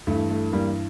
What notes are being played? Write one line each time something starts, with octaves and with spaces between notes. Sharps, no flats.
G2 E3 A3
A3
G2 E3 G3 A#3